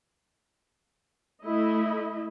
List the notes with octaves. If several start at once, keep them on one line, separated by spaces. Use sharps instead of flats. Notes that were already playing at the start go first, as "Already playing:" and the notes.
A3 E4 D#5 E5